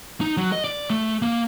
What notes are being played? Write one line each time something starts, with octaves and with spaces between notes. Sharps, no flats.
D#4
F#3
D#5
D5
A3
A#3